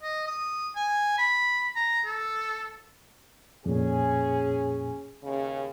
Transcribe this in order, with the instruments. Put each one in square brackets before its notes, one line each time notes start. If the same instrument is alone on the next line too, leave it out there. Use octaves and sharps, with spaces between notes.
[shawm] D#5
D#6
G#5
B5
A#5
A4
[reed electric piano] F2 A#2 [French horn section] C#4 G#4
[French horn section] D#2 C#3